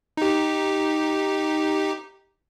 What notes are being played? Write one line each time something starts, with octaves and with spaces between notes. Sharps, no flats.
D#4 G4